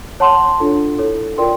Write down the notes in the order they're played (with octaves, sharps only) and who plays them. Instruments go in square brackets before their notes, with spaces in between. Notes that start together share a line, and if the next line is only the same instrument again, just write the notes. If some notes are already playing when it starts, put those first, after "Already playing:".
[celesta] C#5 F#5 A5 C6
D4 F4 A4
E4 A4 C#5
F4 A#4 D5 G5 C6